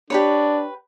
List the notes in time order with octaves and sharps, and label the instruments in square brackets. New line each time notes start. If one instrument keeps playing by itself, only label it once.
[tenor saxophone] D4 [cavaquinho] G4 B4 C#5